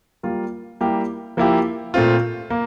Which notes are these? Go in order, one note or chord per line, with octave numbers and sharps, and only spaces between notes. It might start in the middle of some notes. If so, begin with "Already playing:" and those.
G3 A#3 F4
G3 A#3 E4 G4
F3 A#3 E4 G4
A#2 A3 C4 F4
A#3